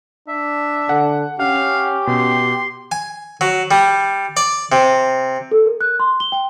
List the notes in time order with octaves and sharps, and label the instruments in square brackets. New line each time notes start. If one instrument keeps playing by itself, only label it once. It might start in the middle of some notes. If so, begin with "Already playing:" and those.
[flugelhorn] D4 [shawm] E5
[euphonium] D3 [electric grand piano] F#5
[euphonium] C#4 [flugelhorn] G4 [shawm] F5 [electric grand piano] F#5
[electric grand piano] B2 [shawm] C6
[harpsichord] G#5
F#3
G3
D5
C3
[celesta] A4
A#4
F#6
C6
G7
G5